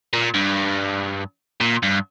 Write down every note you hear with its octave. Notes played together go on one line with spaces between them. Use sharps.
A#2
G2
A#2
G2